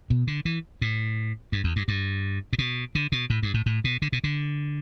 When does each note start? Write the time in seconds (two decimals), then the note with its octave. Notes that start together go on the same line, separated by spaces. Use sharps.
0.10 B2
0.27 D3
0.45 E3
0.82 A2
1.52 G2
1.64 E2
1.76 G2
1.88 G2
2.53 A2
2.59 B2
2.95 D3
3.12 B2
3.30 A2
3.43 G2
3.54 A2
3.66 A2
3.84 B2
4.02 D3
4.12 B2
4.24 D3